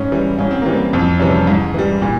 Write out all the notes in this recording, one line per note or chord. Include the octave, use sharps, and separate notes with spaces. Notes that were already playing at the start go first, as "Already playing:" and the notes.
Already playing: G#2 C#4
E3 G3
G#2 C#4
C4
E3 G3 A#3
C4
F2 C4
C3 E3 G3 C#4
G#2
E3 G3
A#2